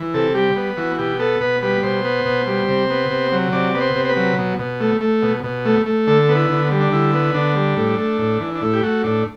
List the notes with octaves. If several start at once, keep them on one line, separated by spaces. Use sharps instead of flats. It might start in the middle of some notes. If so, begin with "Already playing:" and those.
Already playing: E3
C3 A4
G3 G4
B3
E3 F#4
B2 G4
B3 A4
B2 B4
G3 B4
B2 C5
B3
B2
G3
C3
B3
C3
F#3
C3 D5
B3
C5
C3
C5
B4
F#3
B2
B2
A3
A3
B2
B2
A3
A3
D3 A4
B3
E4
D3
G3
D4
D3 E4
B3
D3 D4
G3
A2
A3
A2
E3
D4
A2 E4
G4
A3 F#4
A2 D4